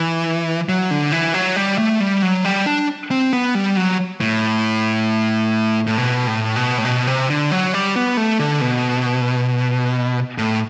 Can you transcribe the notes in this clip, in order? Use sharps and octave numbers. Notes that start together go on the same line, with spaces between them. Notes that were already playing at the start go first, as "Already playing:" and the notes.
Already playing: E3
F#3
D3
E3
F#3
G3
A3
G3
F#3
G3
D4
C4
B3
G3
F#3
A2
A2
B2
A2
B2
A2
B2
C3
D3
F#3
G3
B3
A3
D3
B2
A2